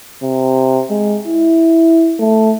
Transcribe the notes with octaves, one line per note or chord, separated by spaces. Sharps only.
C3
G#3
E4
A3